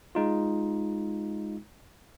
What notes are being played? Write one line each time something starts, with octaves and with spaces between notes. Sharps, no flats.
G#3 D#4 F4